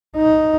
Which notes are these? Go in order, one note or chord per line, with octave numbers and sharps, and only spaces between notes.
D#4